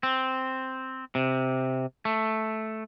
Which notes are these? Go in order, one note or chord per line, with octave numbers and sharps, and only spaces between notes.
C4
C3
A3